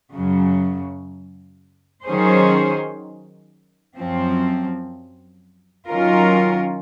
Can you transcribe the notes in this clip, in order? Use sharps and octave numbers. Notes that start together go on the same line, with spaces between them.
F#2 C#3 F#3
D#3 F#3 C#4 G#4 C5
F#2 F3 C4
D#3 F#3 C#4 F4 A#4